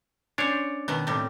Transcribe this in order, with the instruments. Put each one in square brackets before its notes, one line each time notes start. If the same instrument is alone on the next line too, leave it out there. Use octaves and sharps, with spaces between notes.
[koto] C#4 C5 [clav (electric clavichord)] D4 C#5
[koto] B2 D#3 B3
A2 C3 G3